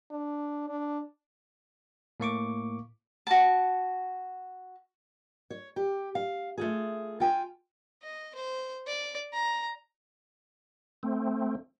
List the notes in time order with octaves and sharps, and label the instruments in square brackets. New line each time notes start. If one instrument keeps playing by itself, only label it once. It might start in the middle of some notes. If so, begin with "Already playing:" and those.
[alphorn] D4
D4
[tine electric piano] A2 A#3 C#6 D6
[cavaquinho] F#4 A5
[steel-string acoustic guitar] C#5
G4
F5
A3 F4 G#4
F4 G5 G#5
[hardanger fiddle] D#5
C5
D5
A#5
[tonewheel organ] A3 C4